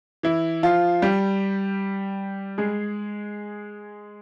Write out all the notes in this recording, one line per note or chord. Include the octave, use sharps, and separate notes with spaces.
E3 E4
F3 F4
G3 G4
G#3 G#4